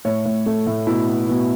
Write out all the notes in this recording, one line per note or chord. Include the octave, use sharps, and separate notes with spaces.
A2 C#5
A2
A3
A2
B2 E4
B3
B2